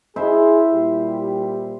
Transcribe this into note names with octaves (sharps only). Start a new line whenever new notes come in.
E4 G#4 C5 E5
A#2 G3 G4